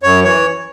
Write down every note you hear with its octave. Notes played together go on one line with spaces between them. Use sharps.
F#2 C#5
E3 C#5